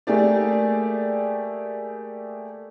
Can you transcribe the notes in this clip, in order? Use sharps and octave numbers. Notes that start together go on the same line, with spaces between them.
A3 A#3 G4 G#4 D5